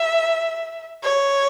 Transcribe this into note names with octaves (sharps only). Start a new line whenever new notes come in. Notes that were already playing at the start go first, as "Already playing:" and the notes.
Already playing: E5
C#5